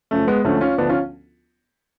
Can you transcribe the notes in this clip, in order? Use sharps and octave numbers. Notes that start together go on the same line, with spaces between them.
F#2 C#3 F3 A3
G#3 B3
D2 D3 F3 A3 C#4
C#4 F4
D2 D3 F3 B3 D4
C#4 F4